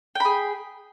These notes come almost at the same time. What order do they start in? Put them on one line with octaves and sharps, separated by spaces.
G5 B5 G#4